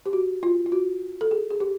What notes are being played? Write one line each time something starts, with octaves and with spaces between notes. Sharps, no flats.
G4
F#4
F4
F4
F#4
A4
G#4
G#4
G4